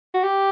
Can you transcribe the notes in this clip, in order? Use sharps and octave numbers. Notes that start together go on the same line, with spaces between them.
F#4
G4